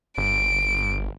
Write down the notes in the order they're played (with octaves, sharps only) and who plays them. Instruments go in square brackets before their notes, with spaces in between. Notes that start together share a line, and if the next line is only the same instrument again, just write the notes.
[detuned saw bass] G1 [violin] D7